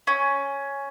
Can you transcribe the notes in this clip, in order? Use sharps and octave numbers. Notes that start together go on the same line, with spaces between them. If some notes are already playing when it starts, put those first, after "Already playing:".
C#4